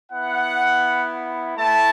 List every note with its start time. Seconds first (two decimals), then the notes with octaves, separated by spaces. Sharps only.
0.11 B3 E4 F#5
1.56 A3 E4 A5